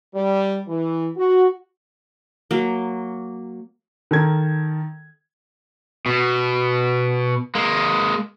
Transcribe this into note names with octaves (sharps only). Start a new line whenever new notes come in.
G3
E3
F#4
F#3 A#3
D#3 A4 A#4 G#6
B2
G#3 A#3